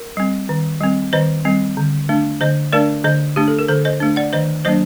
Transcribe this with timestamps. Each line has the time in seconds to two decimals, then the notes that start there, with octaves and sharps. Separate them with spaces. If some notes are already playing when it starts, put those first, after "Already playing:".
Already playing: A#4
0.17 G3 C4
0.49 D#3
0.81 G3 C4
1.13 D#3 C5 D#5
1.45 G3 C4
1.77 D3
2.09 A3 D4
2.41 D3 C5 D#5
2.73 A3 D4 A#4 D5
3.04 D3 C5 D#5
3.36 A3 D4 G4
3.48 A4
3.59 A#4
3.68 D3 A4 C5
3.85 C5 D#5
4.00 A3 D4
4.16 D5 F#5
4.33 D#3 C5 D#5
4.65 F#3 A#3 D4 C5 D#5